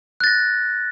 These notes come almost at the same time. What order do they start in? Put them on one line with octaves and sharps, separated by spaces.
F#6 A6 A#6